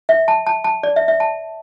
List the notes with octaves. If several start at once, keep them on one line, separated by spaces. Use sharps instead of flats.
E5
A5
A5
A5
D5
E5
E5
A5